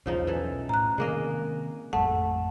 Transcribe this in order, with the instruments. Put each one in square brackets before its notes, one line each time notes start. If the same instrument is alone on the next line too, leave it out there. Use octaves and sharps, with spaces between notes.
[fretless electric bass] B1 E2 [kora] C#3 F3 D#4
[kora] E3 A4
[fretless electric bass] A2 [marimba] A#5 F#6
[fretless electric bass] C3 D#3 [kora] G#3 A#3 D#5
[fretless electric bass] A1 F2 [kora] A3 [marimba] F#5 A5